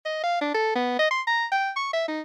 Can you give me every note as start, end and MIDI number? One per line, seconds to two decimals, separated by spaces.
0.06 0.22 75
0.24 0.38 77
0.41 0.52 62
0.54 0.73 69
0.75 0.95 59
0.99 1.09 75
1.11 1.22 84
1.27 1.46 82
1.52 1.70 79
1.76 1.92 85
1.93 2.06 76
2.08 2.21 63